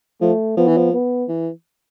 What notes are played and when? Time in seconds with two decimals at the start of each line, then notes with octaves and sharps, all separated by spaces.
0.21 F3 A3
0.57 F3 B3
0.67 E3
0.77 F3
0.93 B3
1.29 E3